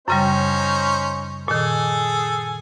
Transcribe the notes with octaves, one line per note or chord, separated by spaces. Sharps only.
F#2 C#3 G3 C#4 D#4 C5
A#2 D#3 G#4 A4 G#5